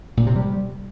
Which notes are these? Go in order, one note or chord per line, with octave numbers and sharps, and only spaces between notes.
A#2
C3
G3